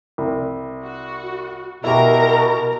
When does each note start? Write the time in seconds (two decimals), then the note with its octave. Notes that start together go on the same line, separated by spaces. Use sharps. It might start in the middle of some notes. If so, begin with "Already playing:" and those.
0.18 C2
0.84 F#4
1.84 B2 E4 G4 A#4 A#5